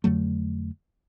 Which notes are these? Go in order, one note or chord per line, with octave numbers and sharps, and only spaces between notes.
F2 D3 F#3 A3